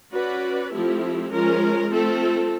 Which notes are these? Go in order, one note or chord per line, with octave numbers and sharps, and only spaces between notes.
C#4 F#4 B4 D5
F3 A3 C4 E4 G4
F3 G#3 C#4 F4 A#4
A3 C4 F4 A4